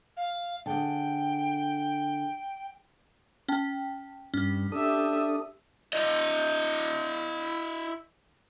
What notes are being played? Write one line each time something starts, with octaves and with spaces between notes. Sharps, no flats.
F5
D3 G#4 G5
C#4 G5 A5
G2 C#4
D4 G4 A4 E5 D#6
E4 D#5